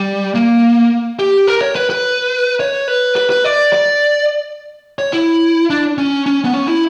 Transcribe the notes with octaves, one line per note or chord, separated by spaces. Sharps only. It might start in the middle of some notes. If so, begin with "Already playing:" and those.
Already playing: G3
A#3
G4
A#4
C#5
B4
B4
C#5
B4
B4
B4
D5
D5
C#5
E4
D4
C#4
C#4
B3
C#4
E4